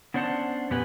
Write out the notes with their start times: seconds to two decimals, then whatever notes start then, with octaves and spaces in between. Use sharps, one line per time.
0.14 B3 C#4 D4 C5 F#5 A5
0.70 F2 A#2 B3 G4 B4 G#5